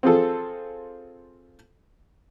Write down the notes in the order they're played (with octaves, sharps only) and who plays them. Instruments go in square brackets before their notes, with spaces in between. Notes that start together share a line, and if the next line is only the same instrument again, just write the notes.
[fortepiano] C4 F4 G#4 A4